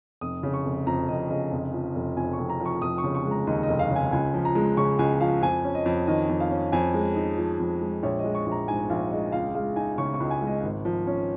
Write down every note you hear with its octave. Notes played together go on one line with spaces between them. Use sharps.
F1 D#6
C#3
C#6
F1
F2 A#5
F1 D#5
C#3 D#5
F1
F3
F1
F2 G#5
C#6
F1
A#5
F3
C#6
F1 D#6
C#6
C#3
C#6
G#3
A#5
D#2 D#5
D#5
F1
F5
C#3
G#5
C#2 G#5
F3
A#5
G#3
C#3 C#6
C#2 G#5
F3 F5
F2 G#5
C#4
D#5
F2
D#3 D#5
F2
F5
C#4
F2 G#5
G#3
D#4
F3
F2
G#3
A#1 C#5
D#5
G#3
C#6
A#1
A#5
G#2 G#5
A#1 F5
G#3 D#5
C#2 F5
G#3 F5
D#4 G#5
C#3 C#6
C#6
C#2
G#5
G#3
D#5
G#1
F3
C#4